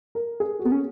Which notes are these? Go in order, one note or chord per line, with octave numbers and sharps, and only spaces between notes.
A#4
G#4
F#4
B3 G#4
C#4